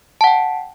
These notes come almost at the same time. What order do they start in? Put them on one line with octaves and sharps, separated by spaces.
A5 F#5 G5